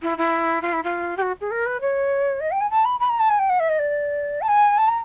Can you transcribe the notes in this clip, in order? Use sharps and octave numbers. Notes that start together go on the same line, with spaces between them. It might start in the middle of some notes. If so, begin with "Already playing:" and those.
E4
E4
F4
E4
F4
G4
F#4
G#4
A#4
B4
C#5
D#5
G5
G#5
A5
B5
B5
A#5
A5
G#5
G5
F#5
E5
D#5
D5
A5
G#5
A5
A#5